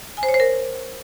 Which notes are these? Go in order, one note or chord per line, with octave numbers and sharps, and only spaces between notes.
G#5
C5
C#5
C5
A#4